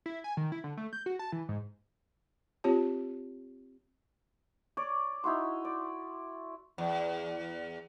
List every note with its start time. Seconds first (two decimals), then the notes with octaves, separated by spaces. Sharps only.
0.06 E4
0.24 G#5
0.37 D#3
0.52 E4
0.64 D3
0.77 A3
0.93 G6
1.06 F#4
1.19 A5
1.32 E3
1.49 G#2
2.64 C4 F4 G4 C#5 A5
4.77 C#5 D5 D6
5.24 D#4 E4 F#4 C6
5.65 D5
6.78 E2